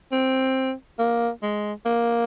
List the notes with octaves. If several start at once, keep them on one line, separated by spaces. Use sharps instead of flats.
C4
A#3
G#3
A#3